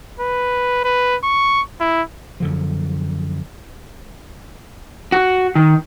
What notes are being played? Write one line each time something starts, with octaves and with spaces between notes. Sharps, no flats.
B4
B4
C#6
E4
F#2 D3 F3
F#4
D#3